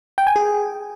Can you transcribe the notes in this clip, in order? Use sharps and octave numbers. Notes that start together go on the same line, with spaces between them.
G5
G#5
G#4